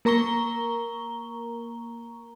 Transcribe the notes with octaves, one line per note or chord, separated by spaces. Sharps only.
A#3 A#4 A#5 C#6 G7